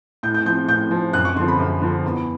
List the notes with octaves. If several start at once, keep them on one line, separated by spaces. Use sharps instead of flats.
A2 G6
G6
F3 G6
A2 G6
F3
F#2 F#6
C#6
D3 F3 C6
B5
F#2
D3 F3
E2